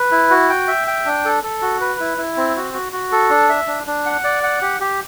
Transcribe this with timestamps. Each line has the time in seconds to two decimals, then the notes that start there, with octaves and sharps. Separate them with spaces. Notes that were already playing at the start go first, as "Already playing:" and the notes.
Already playing: B4
0.11 E4
0.30 F#4
0.49 G5
0.68 E5
0.87 G5
1.05 D4
1.25 A4
1.43 A4
1.62 F#4
1.81 B4
2.00 E4
2.18 E4
2.37 C4
2.56 F#4
2.74 F#4
2.92 F#4
3.12 A4
3.30 D4
3.49 E5
3.67 D4
3.87 D4
4.06 F#5
4.24 D5
4.43 F#5
4.62 G4
4.80 G4